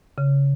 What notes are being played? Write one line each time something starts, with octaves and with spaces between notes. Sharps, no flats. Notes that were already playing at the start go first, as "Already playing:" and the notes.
C#3